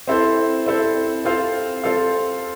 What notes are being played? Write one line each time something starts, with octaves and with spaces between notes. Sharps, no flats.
C4 E4 A4 C5
C4 E4 A4 C5
C4 F4 A4 C5 F5
C4 F4 A4 C5 F5